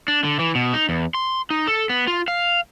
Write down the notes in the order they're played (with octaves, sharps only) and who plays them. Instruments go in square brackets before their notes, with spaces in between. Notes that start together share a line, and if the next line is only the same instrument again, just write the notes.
[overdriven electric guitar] D4
D3
E3
B2
D#4
E2
C6
D#4
A4
B3
F4
F5